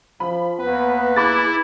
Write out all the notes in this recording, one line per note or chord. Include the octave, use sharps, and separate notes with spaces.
F3 B5
D#2 B3 B4
E4 G#4 B5 D6 A6